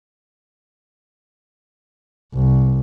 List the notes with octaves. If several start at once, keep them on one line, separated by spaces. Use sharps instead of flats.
C2